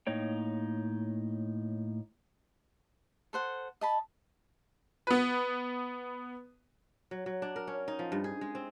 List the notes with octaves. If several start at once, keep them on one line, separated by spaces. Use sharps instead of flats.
A2 A#3 D#4 C#5 G5
A4 C5 F#5
D#5 A5 B5
B3 B4
F#3
F#3
D4
A#4
C#4
D#4
F3
G2
G#4
G#3
C4